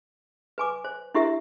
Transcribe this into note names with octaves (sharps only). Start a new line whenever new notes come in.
B4 G#5 D6
C5
D4 E4 G4 A#4 E5